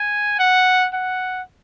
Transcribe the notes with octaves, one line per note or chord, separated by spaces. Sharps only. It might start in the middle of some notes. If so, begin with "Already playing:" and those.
Already playing: G#5
F#5
F#5